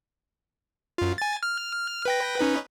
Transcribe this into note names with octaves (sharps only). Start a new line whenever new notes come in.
F#2 F4
G#5 A6
F6
B4 G5 A#6
C#4 D#4 B4